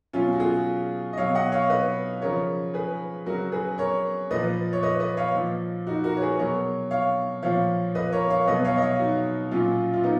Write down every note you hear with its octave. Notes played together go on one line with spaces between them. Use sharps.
B2 F#3 C#4 F4
F#4
F4 G#4
D#5
B2 F#3 C#5 F5
D#5 F#5
C#5 F5
B4 D#5
C#3 F3 A#4 C#5
G#4 B4
C#3 F#3 F#4 A#4
G#4 B4
A#4 C#5
A#2 F3 B4 D#5
C#5
B4 D#5
B4 D#5
C#5 F5
A#2 F3
D#4 F#4
F#4 A#4
C#5
G#4 B4
B2 F#3 A#4 C#5
C#5 F5
A#2 F3 C#5 F5
B4 D#5
A#4 C#5
C#5 F5
B2 F#3 B4 D#5
C#5 F5
D#5
C#5 F5
D#4 F#4
A#2 F#3 C#4 F4
F4
B3 D#4